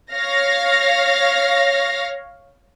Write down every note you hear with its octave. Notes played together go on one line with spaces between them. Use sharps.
C#5 F5 A#6